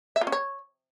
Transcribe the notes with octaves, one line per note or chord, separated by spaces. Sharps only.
E5
F4
C#4
C#5